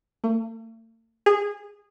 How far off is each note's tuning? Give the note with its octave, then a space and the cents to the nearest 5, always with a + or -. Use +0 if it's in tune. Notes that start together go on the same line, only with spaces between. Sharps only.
A3 +45
G#4 -20